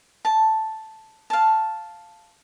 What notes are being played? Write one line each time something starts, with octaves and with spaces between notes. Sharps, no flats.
A5
F5 A5